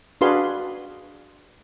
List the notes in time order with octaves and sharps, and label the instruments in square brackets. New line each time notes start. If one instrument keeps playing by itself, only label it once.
[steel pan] D4 F#4 G#4 B4 F5 C6